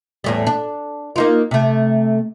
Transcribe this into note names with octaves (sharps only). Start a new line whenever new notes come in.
E2 A2 G3
D4
A#3 D#4 F4
C3 A3